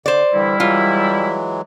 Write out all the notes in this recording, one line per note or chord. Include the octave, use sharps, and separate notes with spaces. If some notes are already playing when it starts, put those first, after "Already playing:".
D3 C5 D5
D3 E3 G3 E4
E3 F#3 G#3 F4